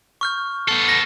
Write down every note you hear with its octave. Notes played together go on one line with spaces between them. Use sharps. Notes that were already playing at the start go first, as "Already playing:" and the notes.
C#6 F6 G6
B3 A4 C7
A#6